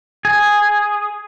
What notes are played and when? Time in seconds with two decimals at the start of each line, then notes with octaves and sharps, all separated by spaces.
0.25 G#4